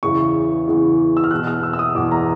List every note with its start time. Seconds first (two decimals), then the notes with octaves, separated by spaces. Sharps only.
0.03 E2 C#3 E3 C#6
0.67 E2 C#3 E3
1.17 E6
1.24 F6
1.31 E2 B2 F#6
1.47 F6
1.63 E6
1.73 E6
1.79 D#6
1.95 E2 B2 D6
2.11 A#5